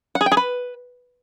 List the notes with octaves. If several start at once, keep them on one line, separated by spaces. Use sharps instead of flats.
F#5
G#4
G5
G#4
B4